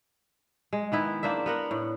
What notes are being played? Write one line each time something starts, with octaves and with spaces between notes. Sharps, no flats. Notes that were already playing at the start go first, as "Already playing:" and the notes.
G#3
D#3 B3 E4
A#3 D4 C5 E5
B3 A#4 F#5
A2